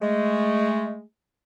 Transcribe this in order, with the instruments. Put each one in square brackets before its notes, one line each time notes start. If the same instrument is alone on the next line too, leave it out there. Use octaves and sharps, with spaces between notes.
[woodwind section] G#3 A3